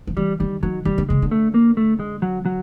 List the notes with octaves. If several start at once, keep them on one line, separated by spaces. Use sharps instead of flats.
F3
E3 G3
D#3 G3
D#3 F#3
D#3 G3
D3
C#3 G#3
D3
A3
A#3
A3
G#3
F#3
F#3